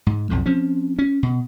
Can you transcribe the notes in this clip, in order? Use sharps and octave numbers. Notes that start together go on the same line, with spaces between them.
G#2
B1 F2 A2
F3 C4 C#4
C#4
B2